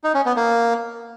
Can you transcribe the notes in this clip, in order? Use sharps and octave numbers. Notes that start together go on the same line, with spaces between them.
D#4
C#4
B3
A#3